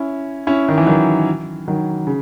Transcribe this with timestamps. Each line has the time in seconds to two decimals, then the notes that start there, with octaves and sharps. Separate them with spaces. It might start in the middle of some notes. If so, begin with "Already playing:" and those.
Already playing: C#4 E4
0.47 C#4 E4
0.68 D#3
0.78 E3
0.86 D#3 F#3
1.68 D#3 F#3
2.07 C#3